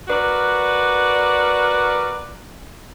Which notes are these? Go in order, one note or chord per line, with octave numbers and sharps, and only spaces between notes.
F#4 A#4 B4 D5